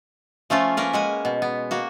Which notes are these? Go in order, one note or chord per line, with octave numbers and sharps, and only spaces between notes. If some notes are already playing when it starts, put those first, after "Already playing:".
F3 A3 C#4 F4
A#3 C#4 A#4 B4
G#3 F#5 G#5
B2
B3
A#3 F#4